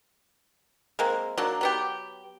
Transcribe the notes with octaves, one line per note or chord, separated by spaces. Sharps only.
G#3 A#3 C4
F#3 A#3 D4
F#3 B3 G4